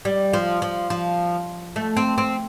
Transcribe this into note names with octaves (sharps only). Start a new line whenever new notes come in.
G3
F3
F3
F3
A3
C4
C4